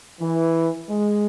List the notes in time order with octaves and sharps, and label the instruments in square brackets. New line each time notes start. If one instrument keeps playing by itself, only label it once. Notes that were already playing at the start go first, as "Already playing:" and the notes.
[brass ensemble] E3
G#3